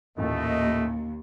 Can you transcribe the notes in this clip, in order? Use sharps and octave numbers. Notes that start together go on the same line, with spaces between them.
A1 D#2 A#2 A3 D#5